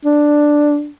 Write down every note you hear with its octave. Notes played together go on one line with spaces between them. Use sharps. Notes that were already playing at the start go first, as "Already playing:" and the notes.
D4